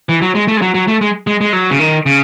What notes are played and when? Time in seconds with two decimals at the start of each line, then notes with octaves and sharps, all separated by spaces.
0.09 E3
0.22 F#3
0.35 G#3
0.48 A3
0.57 G#3
0.62 F#3
0.74 F#3
0.88 A3
1.01 G#3
1.27 G#3
1.41 G#3
1.53 F#3
1.71 C#3
1.79 D#3
2.06 C#3